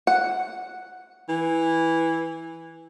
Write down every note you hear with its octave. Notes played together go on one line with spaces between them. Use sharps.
F#5
E3